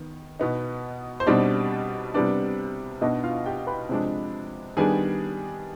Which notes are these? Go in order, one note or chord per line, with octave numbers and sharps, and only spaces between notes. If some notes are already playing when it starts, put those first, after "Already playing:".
Already playing: D#3 B3
B2 B3 D#4
C5
B2 G3 C4 D4 D#4 D5
C3 G3 B3 D4 D5
B2 B3 D4 D#4 D#5
F4 F5
G4 G5
B4 B5
C3 F3 G#3 D4
D#3 G3 B3 D4 G#4 G#5